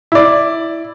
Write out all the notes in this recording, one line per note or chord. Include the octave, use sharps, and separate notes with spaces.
E4 D5